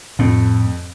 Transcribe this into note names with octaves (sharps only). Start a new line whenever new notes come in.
F2 A2